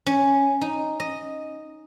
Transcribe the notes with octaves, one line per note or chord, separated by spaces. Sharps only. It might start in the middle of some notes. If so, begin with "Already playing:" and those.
C#4
D#4
D#5